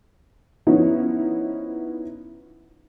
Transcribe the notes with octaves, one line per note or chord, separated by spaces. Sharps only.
F3 B3 C#4 D#4 E4